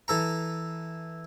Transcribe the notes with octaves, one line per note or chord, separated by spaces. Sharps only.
E3 A4 A#5